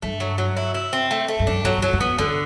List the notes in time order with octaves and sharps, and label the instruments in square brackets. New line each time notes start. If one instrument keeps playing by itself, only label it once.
[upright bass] G2 [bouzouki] A3
[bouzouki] F#3
F#3
E4
E4
C4
A3
A3
[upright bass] G2
[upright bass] F#2 [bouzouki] D4
[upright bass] E2 [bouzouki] F#3
[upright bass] G2
[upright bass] F#2 [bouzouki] F#3
[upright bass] F#2
[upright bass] E2 [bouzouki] B3
[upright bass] E2 [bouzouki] D3